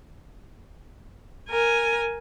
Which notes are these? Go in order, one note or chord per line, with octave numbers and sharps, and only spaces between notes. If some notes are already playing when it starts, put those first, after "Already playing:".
A#4 G#5